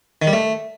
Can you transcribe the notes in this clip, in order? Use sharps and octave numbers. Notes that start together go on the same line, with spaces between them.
D#3
G3
A3